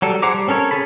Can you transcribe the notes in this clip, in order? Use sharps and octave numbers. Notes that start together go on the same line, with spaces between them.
F#3 G3 A4
G#4 C5 F#5 A#5 D6
G3
C4 C#4 A4 A#4 C#5
C#4 G#4 A4 A5 B5